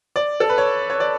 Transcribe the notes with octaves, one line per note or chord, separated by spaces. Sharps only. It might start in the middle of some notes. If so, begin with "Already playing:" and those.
D5
A4
B4
C#5
C#5
D5